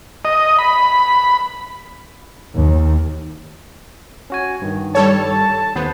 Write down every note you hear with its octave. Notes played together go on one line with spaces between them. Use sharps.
D#5
B5
D#2
C#4 F#4 G#5
G2 D#3
G3 A4 C#5 A5
D#2 B3 C5